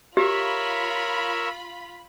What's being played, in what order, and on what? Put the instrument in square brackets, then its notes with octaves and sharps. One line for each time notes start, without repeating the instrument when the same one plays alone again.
[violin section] F4 B5 [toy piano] G4 [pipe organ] A#4 C#5 E5